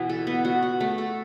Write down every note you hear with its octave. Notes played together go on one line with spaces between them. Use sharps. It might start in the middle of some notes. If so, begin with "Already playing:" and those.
Already playing: B2 E3 B3
A4
B3
F#4
F#4
A3
A4